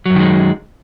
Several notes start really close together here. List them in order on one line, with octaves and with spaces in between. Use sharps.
F#3 F#2 D#3 G#3